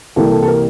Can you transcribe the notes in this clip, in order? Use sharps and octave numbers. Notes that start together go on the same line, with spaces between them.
C2 C3 E3 G3 A#3 A4
A4
A4
A#4